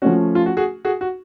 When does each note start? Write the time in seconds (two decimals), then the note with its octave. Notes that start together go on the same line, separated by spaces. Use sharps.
0.02 F3 A3 C#4 F#4
0.35 F4
0.46 F#4
0.57 F#4 G#4
0.85 F#4 G#4
1.01 F#4